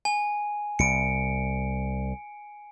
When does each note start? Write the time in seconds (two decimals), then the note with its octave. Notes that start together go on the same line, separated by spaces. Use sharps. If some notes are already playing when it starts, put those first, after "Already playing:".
0.05 G#5
0.79 C2 C#7 D7